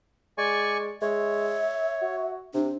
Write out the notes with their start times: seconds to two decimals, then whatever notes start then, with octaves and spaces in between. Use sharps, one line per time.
0.38 G#3 D5 G#5 C#6
1.02 G#3 C#5 E5
2.02 F#4
2.54 C3 D4